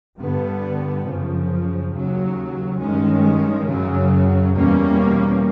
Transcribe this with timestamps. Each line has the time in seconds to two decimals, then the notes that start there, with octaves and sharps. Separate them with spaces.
0.19 G2 D3 G3 B3
1.07 F#2 C#3 F3
1.94 D#2 C#3 F#3
2.82 G2 D#3 G#3 C#4
3.70 F#2 C#3 F#3
4.57 E2 B2 G3 A#3 C#4